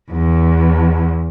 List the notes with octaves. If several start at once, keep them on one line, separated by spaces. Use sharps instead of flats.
E2